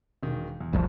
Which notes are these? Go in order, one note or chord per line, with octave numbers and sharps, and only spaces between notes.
E1 D#3
E2
F1 C2 F3